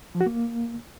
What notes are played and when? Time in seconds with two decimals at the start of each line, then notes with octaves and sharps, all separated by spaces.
0.15 F3
0.21 F#4
0.26 A#3